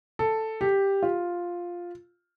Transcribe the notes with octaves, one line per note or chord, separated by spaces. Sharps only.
A4
G4
F4